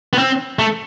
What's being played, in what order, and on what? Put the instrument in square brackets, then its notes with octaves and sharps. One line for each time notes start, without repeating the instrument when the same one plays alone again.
[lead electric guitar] B3
C4
A3